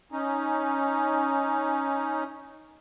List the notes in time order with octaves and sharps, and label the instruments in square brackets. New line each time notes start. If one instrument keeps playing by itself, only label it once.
[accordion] C#4 D#4